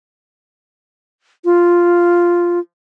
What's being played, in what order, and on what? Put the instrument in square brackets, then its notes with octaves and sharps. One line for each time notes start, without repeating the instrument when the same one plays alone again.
[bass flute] F4